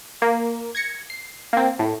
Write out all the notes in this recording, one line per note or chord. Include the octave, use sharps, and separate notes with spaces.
A#3
G#6 A#6 C#7
C7
A#3 C4
A2